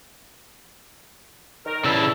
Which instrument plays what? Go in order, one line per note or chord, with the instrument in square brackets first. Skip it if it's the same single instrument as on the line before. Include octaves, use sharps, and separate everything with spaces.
[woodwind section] D#3 A#4
[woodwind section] E2 G3 E4 [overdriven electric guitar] C#3 A4